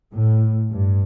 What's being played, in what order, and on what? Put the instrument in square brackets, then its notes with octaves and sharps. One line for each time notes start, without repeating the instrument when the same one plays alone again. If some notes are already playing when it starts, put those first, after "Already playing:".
[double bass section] A2
G2